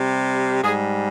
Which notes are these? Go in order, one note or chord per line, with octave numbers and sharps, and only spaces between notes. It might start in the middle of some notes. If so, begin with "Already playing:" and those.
Already playing: C3 G3
G#2 G3 G#4